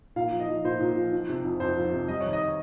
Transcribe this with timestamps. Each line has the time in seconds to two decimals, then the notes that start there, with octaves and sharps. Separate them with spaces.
0.16 A#2 F5
0.32 F3
0.40 D#5
0.48 F3
0.64 A#2 C5
0.80 A#2
0.96 F3
1.12 F3
1.29 C3
1.45 F2
1.60 F2 C5
1.76 F3
1.92 C3
2.08 G3 D#5
2.21 D#3 C#5
2.33 D#5